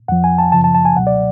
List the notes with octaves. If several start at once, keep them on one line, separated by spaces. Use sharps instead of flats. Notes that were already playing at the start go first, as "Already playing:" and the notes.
F2 F3 F#5
G#5
A5
F#2 C#3 F3 A5
A5
A5
G#5
C#2 B2 F#3 F#5
D5